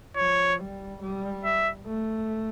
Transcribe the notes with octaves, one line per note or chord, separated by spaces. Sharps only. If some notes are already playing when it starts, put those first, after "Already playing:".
F3 C#5
G3
G3
E5
A3